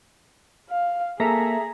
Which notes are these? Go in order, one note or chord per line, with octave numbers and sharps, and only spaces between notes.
F5
A#3 G#4 A4 E5 A#5 B6